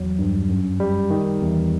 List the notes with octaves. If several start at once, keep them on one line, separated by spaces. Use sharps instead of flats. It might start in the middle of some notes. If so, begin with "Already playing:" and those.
Already playing: E2 F#3
G2
F#2
G3
D#3
E2